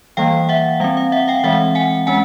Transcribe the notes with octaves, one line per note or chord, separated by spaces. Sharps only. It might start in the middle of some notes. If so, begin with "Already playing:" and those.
E3 G3 A#3 F5 G5
E5 F#5
G3 C4 F5
F5
E5 F#5
F5 G5
E3 G#3 C4 E5 F#5
F#5 G#5
G#3 C#4 F#5 G#5